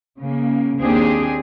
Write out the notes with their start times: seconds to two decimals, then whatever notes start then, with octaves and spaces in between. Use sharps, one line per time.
0.20 C#3 A#3
0.80 D#2 A#3 C4 D4 G4 G#4